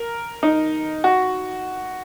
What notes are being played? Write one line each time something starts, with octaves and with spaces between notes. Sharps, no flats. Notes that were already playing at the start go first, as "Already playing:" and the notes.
Already playing: A#4
D#4
F#4